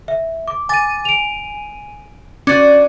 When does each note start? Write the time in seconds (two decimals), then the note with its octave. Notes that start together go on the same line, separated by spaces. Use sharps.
0.08 E5
0.48 D6
0.69 G#5 D6 A6 D#7
1.05 D7 F7
2.47 C#4 D4 F#4 D6 A6